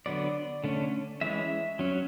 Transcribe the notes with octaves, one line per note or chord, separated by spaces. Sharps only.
D3 F#3 B3 D5
D3 A3 C#4
E3 G#3 C#4 E5
F#3 C#4